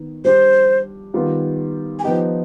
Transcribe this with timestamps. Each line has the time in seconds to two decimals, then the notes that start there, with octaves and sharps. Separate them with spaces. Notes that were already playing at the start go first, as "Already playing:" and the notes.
Already playing: D#3 B3
0.25 G3 D4 G4 C5
1.14 D#3 G3 B3 F4
1.99 G#5
2.04 F3 B3 D#4 G4 G5